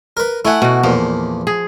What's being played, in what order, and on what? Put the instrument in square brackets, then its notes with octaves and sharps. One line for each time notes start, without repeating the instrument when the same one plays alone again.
[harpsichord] A#4 B4
[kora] A3 F#5 [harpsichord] E4 G#5
[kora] B2 F#4
[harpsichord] E2 A#2 [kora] F3
[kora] G#4